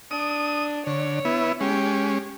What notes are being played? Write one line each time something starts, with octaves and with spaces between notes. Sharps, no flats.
D4 D#6
D3 C#5
B3 E4
G#3 C#4 G4